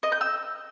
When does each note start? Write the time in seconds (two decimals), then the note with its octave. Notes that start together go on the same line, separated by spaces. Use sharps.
0.03 D#5
0.12 G6
0.21 E6